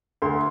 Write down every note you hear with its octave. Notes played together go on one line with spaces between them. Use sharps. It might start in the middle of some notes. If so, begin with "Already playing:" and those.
D2 C6